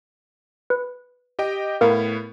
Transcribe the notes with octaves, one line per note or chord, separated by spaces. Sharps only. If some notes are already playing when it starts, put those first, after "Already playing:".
B4
G4 D#5 G5
A2 B3 A#4 F5